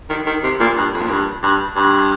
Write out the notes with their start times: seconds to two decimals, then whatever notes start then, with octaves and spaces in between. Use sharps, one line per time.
0.10 D#3
0.26 D#3
0.43 C3
0.60 A#2
0.77 G2
0.94 F2
1.02 A#2
1.09 G2
1.43 G2
1.76 G2